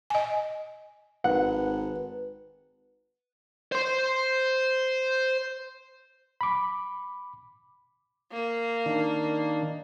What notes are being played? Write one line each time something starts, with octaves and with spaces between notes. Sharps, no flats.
D#5 G#5
G#1 B4 F#5
C5 C6
B5 D6
A#3
D#3 D4